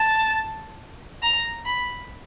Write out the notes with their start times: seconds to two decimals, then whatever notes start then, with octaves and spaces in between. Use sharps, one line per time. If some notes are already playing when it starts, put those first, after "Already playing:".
Already playing: A5
1.23 A#5
1.66 B5